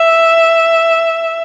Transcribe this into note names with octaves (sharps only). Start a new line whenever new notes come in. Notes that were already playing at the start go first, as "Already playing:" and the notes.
Already playing: E5